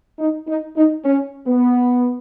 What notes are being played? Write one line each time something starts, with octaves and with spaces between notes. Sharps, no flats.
D#4
D#4
D#4
C#4
B3